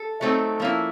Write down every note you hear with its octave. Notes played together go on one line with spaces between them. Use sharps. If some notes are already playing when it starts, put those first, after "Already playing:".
Already playing: A4
F#3 A3 C4 D#4
F3 A#3 C#4 E4